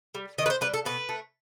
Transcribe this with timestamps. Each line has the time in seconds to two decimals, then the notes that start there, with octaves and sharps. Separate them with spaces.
0.14 G3
0.38 D#3 D#5
0.46 B4
0.50 C5
0.61 G3 B4
0.74 A4
0.85 B2 B4
1.09 A3